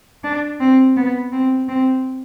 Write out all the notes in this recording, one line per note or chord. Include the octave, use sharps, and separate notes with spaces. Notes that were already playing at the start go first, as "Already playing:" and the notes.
D4
C4
B3
C4
C4